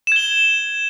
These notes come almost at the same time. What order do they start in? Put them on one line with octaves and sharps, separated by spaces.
E7 G#6 G7